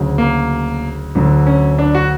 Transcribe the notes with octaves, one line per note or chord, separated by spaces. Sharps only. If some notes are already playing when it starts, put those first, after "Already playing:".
Already playing: D2 C#3 F#3
A#3
D2 D3 F#3
C#4
D4
F#4